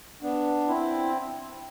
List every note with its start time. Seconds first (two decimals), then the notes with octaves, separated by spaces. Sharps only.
0.22 B3 D4
0.68 C4 E4